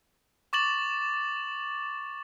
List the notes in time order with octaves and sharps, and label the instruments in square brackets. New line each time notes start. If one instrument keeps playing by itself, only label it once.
[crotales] C#6 D6 A6 E7 F#7